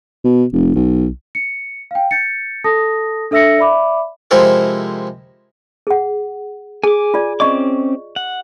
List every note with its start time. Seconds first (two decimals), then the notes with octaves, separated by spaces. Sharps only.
0.24 B2
0.53 F1
0.75 B1
1.35 C#7
1.91 F5 G5
2.11 G6 A6 C#7
2.64 A4 A5 D#6 A#6
3.31 D4 A4 E5 E6 A#6 C#7
3.58 D5 E5 B5 D6
4.31 C3 F3 G#3 E4 A4 A#4
5.87 G#4 F#5
6.84 G#4 G#5 D6
7.14 F4 D5
7.40 C4 C#4 D5 D#5 C#6 D6
8.16 F#5